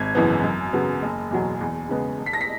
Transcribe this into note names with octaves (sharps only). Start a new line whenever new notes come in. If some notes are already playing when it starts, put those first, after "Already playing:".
Already playing: G#1 G#6
F#2 C#3 E3 B3
F#2
C#3 F#3 B3
F#1
E2 B2 F#3
E2
C#3 G#3 B3
E1
B6
A#6
B6